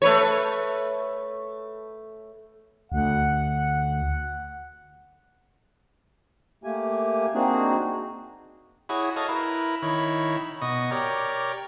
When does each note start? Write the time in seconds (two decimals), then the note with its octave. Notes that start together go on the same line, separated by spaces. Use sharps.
0.02 A3 B4 C#5
2.92 D2 F#5
6.64 A3 A#3 G4 G#5
7.34 A#3 C4 D4 D#4 F#4 G#4
8.89 E4 F#4 G#4 C#5
9.16 A4 C#5 D#5 F5
9.29 E4 A#4 B4
9.82 D#3 E4 C#5 B5
10.62 B2 D#5 C#6
10.91 G4 A#4 C#5 D5